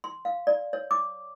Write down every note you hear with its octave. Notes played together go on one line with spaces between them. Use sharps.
C6
F5
D5
C#5
D6